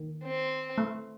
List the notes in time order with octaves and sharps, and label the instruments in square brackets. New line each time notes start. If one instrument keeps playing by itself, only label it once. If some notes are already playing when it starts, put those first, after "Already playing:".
Already playing: [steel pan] D#3
[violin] C4
[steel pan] A3